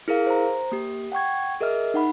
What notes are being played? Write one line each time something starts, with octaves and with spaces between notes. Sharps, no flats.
E4 G#4 A#4 F5
C5 A#5
A#3 G4
F#5 G5 C#6 G#6
G#4 A#4 D#5 E5 F6
D#4 F#5 B5